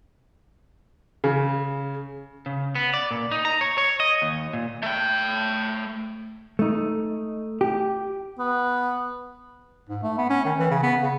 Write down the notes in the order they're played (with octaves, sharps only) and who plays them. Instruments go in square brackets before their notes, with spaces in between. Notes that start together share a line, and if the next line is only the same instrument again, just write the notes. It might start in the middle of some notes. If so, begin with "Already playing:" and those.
[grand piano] C#3
[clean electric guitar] C#3
B3
D5
A#2
D#4
A#5
C#5
C#5
D#5
D#2
A#2
[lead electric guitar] A3 G5
[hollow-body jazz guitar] A3 D#4
G4
[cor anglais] B3
[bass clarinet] G#2
A3
B3
C#4
D#3
E3
C#3
B3
C#3